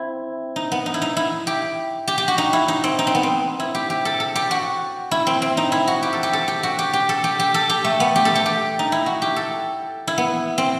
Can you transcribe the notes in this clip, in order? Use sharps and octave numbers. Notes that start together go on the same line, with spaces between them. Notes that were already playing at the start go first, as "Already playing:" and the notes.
Already playing: C4 E4
D#4
B3
D#4
E4
D#4
E4
G4
G4
G4
F#4
D#4
E4
D#4
C4
D#4
C4
B3
C4
E4
G4
G4
A4
A4
G4
F#4
E4
C4
C4
D#4
E4
F#4
G4
A4
G4
A4
G4
F#4
G4
G4
A4
G4
G4
A4
G4
A3
B3
G4
A4
G4
G4
D#4
E4
F#4
G4
A4
E4
B3
C4